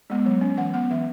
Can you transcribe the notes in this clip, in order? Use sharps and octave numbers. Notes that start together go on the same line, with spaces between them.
G#3 B3
F#3
C#4
E3 F#5
B3 F#5
E3 E5